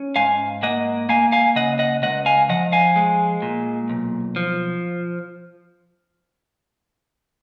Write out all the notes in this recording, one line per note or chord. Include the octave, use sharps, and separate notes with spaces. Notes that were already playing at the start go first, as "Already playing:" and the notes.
Already playing: C#4
G#2 F5 G#5
A#3 D#5 F#5
A#3 F5 G#5
F5 G#5
C#3 D#5 F#5
D#5 F#5
C#2 D#5 F#5
F5 G#5
F3 D#5 F#5
F5 G#5
G#3
A#2
B1
F3